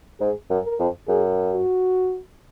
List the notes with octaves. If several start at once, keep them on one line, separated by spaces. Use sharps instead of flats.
G#2 G#4
F#2
A#4
F2
F#2 G#4
F#4